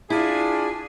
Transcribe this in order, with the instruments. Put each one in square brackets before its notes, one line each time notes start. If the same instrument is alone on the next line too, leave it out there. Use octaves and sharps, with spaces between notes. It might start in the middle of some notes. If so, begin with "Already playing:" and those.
[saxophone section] D4 F4 G#4 [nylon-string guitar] E4